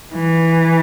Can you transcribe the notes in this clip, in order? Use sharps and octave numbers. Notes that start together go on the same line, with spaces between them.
E3